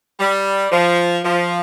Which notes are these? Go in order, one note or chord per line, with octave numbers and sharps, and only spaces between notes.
G3
F3
F3